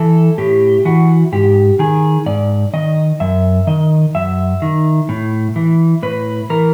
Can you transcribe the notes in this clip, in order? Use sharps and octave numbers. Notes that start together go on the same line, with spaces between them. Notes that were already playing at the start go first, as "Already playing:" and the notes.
Already playing: E3 A4
A2 G4
E3 F#4
G#2 G4
D#3 G#4
G#2 D5
D#3 D#5
F#2 E5
D#3 D#5
F#2 E5
D#3
A2
E3
A2 B4
E3 A#4